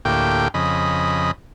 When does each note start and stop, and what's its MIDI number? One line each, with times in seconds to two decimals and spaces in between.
0.05 0.48 38
0.05 0.48 45
0.05 0.48 58
0.05 0.48 67
0.05 0.48 79
0.54 1.31 41
0.54 1.31 49
0.54 1.31 75
0.54 1.31 83